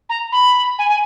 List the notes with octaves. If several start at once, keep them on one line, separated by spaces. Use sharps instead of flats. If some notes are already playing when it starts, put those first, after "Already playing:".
A#5
B5
G#5
G#5